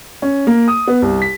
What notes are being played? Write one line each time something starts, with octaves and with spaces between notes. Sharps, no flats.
C#4
A#3
D#6
B3
C2
B6